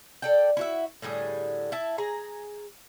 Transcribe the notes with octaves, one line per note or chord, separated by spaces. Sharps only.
A4 D5 G5
E4 F#4 E5
A2 D3 G3 G#4
E4 E5 A5
G#4 A#5